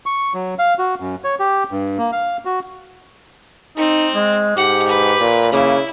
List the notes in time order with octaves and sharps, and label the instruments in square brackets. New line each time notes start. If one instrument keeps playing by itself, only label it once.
[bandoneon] C#6
F#3
F5
F#4
F#2
C#5
G4
G2
A#3
F5
F#4
[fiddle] C4 [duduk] D#4
[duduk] G#3
[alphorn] G#2 [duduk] G4 [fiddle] F#5
[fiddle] B4
[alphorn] A#2
[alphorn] C#3 [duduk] A#3 [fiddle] E4